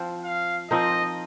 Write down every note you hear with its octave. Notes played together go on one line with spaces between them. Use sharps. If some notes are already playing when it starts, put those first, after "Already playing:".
Already playing: F3 C4 F4 C5
F5
F3 C4 D#4 A#4 D#5